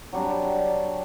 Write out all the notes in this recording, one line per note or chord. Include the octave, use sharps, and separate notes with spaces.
F#3 G3 D4